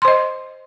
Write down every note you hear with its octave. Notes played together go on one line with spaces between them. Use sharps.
C5 D#5 C6